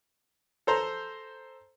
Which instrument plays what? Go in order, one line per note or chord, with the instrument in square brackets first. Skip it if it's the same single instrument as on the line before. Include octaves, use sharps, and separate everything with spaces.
[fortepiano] A4 C5 A#5